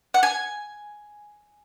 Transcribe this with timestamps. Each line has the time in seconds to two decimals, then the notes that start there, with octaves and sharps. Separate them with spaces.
0.14 F#5
0.23 G#5